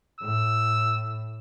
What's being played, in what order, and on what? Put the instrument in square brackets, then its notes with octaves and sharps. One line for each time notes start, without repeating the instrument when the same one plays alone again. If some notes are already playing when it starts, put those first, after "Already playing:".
[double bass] A2 [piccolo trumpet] E6